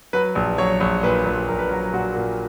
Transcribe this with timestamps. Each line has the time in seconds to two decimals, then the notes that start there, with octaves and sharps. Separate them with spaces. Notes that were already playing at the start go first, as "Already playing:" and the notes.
0.13 F#3 B4
0.35 A#1
0.58 F#3 C#5
0.80 A#1
1.03 A#2 B4
1.25 A#1
1.48 A#1 A#4
1.59 B4
1.69 F#3 A#4
1.92 A#2 F#4
2.16 A#2